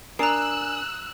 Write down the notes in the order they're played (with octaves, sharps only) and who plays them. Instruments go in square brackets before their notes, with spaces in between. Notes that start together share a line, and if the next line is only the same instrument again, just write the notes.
[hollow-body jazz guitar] D4 A#4 [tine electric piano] G#5 D#6 [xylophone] A#5 C7 [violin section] E6 F#6